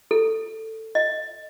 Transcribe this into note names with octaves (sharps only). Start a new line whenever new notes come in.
A4
D#5